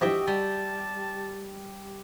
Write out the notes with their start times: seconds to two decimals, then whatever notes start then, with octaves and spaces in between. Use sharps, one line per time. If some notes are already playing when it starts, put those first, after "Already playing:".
0.01 G2 E3 F3 F#4 G4 D#5 E5 G5
0.27 G3 A5